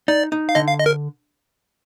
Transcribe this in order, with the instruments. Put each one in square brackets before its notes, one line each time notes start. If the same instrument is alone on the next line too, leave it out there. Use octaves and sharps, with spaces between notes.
[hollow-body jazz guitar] D#4 [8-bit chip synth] D5
[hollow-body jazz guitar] D#4
[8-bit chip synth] F5
[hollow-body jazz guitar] D3 [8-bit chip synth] D#5
[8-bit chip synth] F5
D#5
A#4